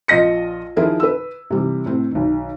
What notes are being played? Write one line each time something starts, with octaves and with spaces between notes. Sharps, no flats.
A#1 F3 F4 D#5 A#6 C#7
D#3 F3 E4 G#4 A#4 C5
B4 E6
C3 E3 G3
A2 C4
B1 D#3